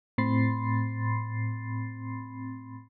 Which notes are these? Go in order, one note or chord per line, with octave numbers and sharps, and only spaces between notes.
A2 C4 B5 C6 A6 C7